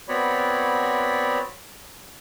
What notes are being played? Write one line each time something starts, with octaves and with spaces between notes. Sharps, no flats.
B3 C4 F#4 C#5 D5 B5